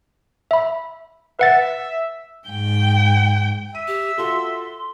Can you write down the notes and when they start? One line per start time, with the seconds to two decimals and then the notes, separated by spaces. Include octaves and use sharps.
0.51 E5 B5
1.39 B4 E5 F#5 A6
2.48 G#2 G5
3.75 E5 D#7
3.88 G4
4.18 F4 F#4 A4 C6